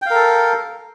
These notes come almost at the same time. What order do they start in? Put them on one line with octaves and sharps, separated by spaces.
G5 F5 A#4 A4